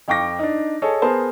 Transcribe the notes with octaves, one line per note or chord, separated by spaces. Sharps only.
F2 F5 G5 C#6 D6 A#6
D4 D#4
G#4 A4 C#5 D#5
B3 G#4 A#4 C5 A5